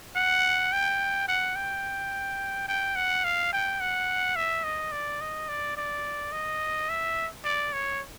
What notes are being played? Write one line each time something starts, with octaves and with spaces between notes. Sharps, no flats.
F#5
G5
F#5
G5
G5
F#5
F5
G5
F#5
E5
D#5
D5
D#5
D5
D5
D#5
E5
D5
C#5